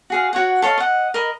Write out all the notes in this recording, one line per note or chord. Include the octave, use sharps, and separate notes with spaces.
F#4 G#4 F5
F#4 C#5 F#5
A4 C#5 D#5 F5
D#5 F#5
A#4 D#5 B5